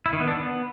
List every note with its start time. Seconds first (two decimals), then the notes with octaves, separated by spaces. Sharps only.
0.06 E4
0.13 D#3
0.20 B3
0.28 D4
0.35 B3